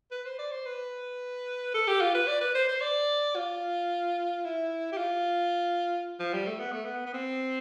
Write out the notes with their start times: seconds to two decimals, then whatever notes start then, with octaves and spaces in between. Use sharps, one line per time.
0.11 B4
0.25 C5
0.39 D5
0.52 C5
0.66 B4
1.74 A4
1.87 G4
2.01 F4
2.14 B4
2.27 D5
2.41 B4
2.55 C5
2.68 C5
2.81 D5
3.36 F4
4.44 E4
4.92 G4
4.97 F4
6.20 F3
6.33 G3
6.47 A3
6.60 B3
6.72 A3
6.85 B3
7.06 B3
7.14 C4